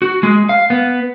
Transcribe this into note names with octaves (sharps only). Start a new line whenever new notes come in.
F#4
G#3
F5
B3